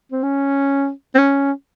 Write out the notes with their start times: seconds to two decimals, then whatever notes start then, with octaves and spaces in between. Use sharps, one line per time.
0.12 C4
0.23 C#4
1.14 C4
1.18 C#4